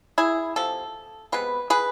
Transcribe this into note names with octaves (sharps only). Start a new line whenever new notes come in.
E4 G#4
C3 F3 A4
C3 G#3 B3 B4
G#4 B4